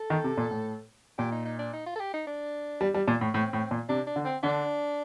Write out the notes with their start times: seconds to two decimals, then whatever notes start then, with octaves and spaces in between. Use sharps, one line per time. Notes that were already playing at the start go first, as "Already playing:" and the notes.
Already playing: A4
0.10 D#3
0.24 C3
0.37 A#2
0.51 A2
1.18 A#2 G4
1.32 D#4
1.45 D#4
1.59 D4
1.73 D#4
1.86 F4
1.96 A4
2.00 G4
2.14 D#4
2.27 D4
2.81 G3
2.94 G3
3.08 A#2
3.21 A2
3.34 A2 C4
3.53 A2
3.71 A#2
3.89 C3 D4
4.07 D4
4.16 D3
4.25 C4
4.43 D3 D4